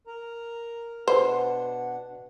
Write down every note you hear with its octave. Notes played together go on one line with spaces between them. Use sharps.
A#4 A#5
B2 D4 B4 C5 F#5